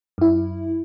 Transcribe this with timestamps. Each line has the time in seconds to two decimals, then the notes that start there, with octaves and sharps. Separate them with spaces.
0.18 F#2 E4